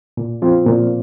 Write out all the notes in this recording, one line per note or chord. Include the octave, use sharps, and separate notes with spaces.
A#2
F3 C4 F4
A#2